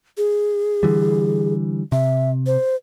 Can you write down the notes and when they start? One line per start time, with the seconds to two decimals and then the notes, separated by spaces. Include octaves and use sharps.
0.17 G#4
0.83 D3 E3 G3
1.92 C3 E5
2.47 C5